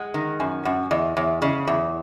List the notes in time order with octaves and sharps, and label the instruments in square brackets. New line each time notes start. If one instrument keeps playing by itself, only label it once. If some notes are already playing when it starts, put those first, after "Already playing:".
Already playing: [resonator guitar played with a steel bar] G#3 [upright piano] F#5
[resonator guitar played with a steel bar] D#3
[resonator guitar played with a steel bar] F#2 [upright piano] G#5
[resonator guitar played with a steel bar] F#2 [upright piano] F#5
[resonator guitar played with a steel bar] E2 [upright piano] D#5
[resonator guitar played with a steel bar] E2 [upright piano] C#5
[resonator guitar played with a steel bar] C#3 [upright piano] D#5
[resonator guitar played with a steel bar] E2 [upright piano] E5